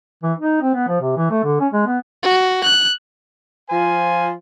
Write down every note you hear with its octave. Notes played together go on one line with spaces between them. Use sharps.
E3
D#4
C4
B3
F3
C3
E3
A3
D3
C#4
G#3
B3
F#4
F#6
F3 F4 C5 G#5